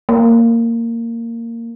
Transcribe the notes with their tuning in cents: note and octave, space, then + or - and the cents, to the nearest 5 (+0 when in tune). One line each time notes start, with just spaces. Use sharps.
A#3 -15